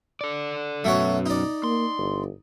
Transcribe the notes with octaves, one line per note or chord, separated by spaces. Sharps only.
A4 D5
F#2 B2 A3 F#4 C#5
D#4 D5
A#3 C6
G1